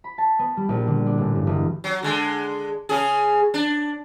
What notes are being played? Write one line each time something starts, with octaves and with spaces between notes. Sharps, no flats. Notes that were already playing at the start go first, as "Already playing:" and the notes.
B5
A5
B3
G3
A#1
D3
D4
A1
G2
E1
F#3
D3 G#3
C#3 G#4
D4